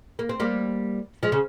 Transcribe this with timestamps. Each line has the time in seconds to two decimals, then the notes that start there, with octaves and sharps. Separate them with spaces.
0.19 A#3
0.29 C4
0.40 G3 A#3
1.23 F3 G#3
1.32 C#3